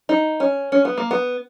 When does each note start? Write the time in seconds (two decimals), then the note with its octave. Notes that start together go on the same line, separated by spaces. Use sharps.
0.09 D#4
0.40 C#4
0.72 C#4
0.85 B3
0.98 A#3
1.11 B3